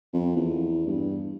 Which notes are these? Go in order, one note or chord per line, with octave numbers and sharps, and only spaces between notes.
F2
E2
G2